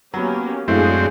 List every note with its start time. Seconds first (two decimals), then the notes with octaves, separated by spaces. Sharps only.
0.14 F#3 A#3 B3 C#4 G4
0.68 F#2 A2 G#3 C4 D4 G#4 E5 F5